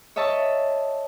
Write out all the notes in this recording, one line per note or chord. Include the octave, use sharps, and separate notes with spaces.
C#5 D#5 E5 A5 C#6